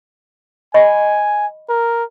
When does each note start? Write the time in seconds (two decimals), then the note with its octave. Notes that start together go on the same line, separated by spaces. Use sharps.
0.74 D#5 G#5 B5 C#6
1.69 A#4